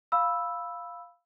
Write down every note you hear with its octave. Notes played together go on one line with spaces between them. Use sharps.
F5 B5 E6